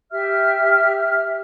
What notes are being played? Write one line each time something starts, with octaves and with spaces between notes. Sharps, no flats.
G4 E5 F6